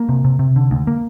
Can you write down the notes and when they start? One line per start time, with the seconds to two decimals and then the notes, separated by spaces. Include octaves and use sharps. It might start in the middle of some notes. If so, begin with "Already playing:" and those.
Already playing: A#3
0.09 C3
0.25 C3
0.39 C3
0.56 D3
0.71 D2
0.87 A#3